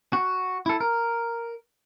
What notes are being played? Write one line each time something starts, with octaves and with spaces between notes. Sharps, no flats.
F#4
E4 A4
A#4